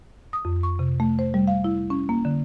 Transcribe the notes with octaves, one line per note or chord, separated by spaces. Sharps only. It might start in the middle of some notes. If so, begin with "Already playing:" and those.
D#6
F2
C#6
C3
A3
C5
G3
F5
E4
C#4
A#3
D3